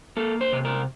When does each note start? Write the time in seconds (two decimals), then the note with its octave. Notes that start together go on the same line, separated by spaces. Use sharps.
0.17 A#3 A4
0.41 C5
0.53 C3
0.65 A#4